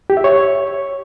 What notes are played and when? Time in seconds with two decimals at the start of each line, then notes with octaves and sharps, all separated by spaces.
0.10 G4
0.17 E5
0.24 C#5